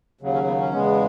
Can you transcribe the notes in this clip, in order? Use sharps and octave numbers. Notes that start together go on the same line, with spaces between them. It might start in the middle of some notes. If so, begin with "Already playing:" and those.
D#2 C#3 F#3
C#4
B3
C#4
E2 C#3 G#3 B3